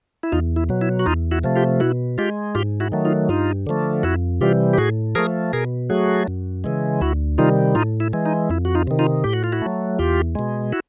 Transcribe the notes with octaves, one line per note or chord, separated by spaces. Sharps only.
E4
E2 D#4 F4
E4
B2 F#3
E4
F#4
E2 D#4 F4
E4 F#4
C3 F3 A3
F4 G4
B2 E4 F#4
G#3 F4 G4
G#2 F4 G4
E4 F#4
D#3 F#3 A3
D#4 F4
G2 D#4 F4
D3 F3 A3
F2 E4 F#4
C3 E3 G3 F4 G4
G4
A2 F#4 G#4
F3 A3 G#4 A#4
B2 G#4 A#4
F#3 A3 F#4 G#4
F#2
C#3 E3 G#3
D2 E4 F#4
C3 D#3 G3 D#4 F4
A2 D#4 F4
E4
E3 G#3
D#4
F2 E4
F#4
D#4 F4
C3 D#3
D#4 F4
A2 G4
F#4
F4
E4 F#4
F#3 A3
E2 F4 G4
B2 G#3
E4 F#4